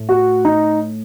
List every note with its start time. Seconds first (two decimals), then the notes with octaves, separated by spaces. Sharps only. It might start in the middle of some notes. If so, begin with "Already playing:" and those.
Already playing: A2 A3
0.09 F#4
0.45 D#4